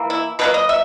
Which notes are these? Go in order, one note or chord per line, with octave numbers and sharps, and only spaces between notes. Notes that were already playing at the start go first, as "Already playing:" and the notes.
Already playing: E3 A#3
E4
B2 F#3 A#3 B4
D#5
E5